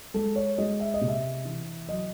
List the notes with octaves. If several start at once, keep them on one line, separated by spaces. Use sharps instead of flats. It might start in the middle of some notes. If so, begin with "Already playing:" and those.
G#3 A4
C#5
G#3 D#5
E5
D#5
C3
E5
E3
F#3 D#5